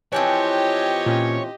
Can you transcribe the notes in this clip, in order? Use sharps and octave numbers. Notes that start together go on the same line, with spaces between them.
E3 F3 C4 G4 C#5 D#5
A#2 C#4